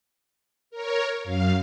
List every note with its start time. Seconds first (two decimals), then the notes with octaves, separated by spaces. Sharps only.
0.70 A#4 C#5
1.23 F#2 F5